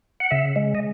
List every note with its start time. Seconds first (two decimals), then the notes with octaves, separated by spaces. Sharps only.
0.20 F#5
0.31 C#3 E5
0.56 G#3
0.75 D#5